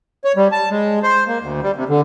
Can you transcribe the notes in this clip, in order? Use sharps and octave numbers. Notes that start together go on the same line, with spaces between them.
C#5
G3
A5
G#3
C5
A#3
D2
G3
C3
D3